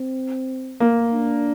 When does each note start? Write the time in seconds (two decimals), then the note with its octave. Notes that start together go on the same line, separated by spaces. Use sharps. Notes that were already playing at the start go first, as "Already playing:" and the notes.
Already playing: C4
0.80 A#3
1.12 D4